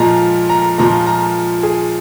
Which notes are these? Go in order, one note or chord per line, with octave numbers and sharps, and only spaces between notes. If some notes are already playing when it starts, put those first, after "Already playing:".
Already playing: A#2 F3 G#3 A#5
A#5
A#2 F3 G#3 A#5
A#5
G#4